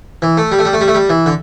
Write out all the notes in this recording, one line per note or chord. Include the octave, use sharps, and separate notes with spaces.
E3
A3
G3
A3
G3
A3
G3
A3
G3
E3
D3